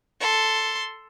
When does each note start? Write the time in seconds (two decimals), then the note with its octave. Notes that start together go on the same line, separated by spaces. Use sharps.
0.21 A4 C6